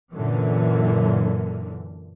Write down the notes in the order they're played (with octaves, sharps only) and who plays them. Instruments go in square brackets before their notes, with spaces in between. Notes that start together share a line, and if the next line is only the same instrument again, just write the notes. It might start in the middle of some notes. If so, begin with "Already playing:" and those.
[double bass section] F#2 A#2 D3 E3